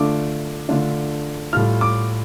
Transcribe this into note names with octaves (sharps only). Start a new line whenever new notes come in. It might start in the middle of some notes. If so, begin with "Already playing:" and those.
Already playing: D3 A3 D4 F4 D6
D3 A3 D4 F4
A2 G3 F4 F6
D6